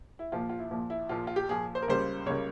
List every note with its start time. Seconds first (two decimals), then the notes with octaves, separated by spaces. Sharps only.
0.19 E4
0.32 A#1 A#2 F3 F4
0.49 F4
0.59 E4
0.71 A#1 A#2 F3
0.90 E4
1.09 A#1 A#2 F3 F4
1.27 F4
1.36 G4
1.48 A#1 A#2 F3 G#4
1.75 C5
1.82 A#4
1.88 C#2 C#3 G3 A#3 C5
2.26 C#2 C#3 G3 A#3 C#5